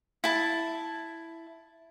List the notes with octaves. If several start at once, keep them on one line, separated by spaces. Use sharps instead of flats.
E4 A5